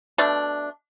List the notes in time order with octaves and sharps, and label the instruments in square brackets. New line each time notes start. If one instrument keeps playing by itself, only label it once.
[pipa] B2 A3 D4